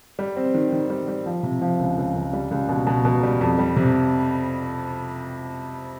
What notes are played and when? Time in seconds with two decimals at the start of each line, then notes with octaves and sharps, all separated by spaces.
0.19 G3
0.36 C4
0.54 D#3
0.72 D#3
0.90 G3
1.08 G3
1.26 F3
1.43 C3
1.62 F3
1.79 C#2
1.98 C#2
2.15 C#2
2.33 G3
2.51 C#2
2.69 B2
2.87 B2
3.05 B2
3.23 G3
3.41 F2
3.59 G3
3.76 C3